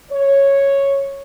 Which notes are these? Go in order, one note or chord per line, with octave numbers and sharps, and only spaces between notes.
C#5